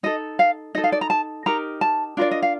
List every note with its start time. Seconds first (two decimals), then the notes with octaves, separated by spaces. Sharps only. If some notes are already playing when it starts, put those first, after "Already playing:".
0.03 D#4 A4 D#5
0.39 F5
0.75 D#4 A4 D#5
0.84 F5
0.92 D5
1.01 A#5
1.10 A5
1.46 D#4 G4 A#4 A#5
1.81 A5
2.17 D4 F4 A#4 D5
2.31 D#5
2.42 F5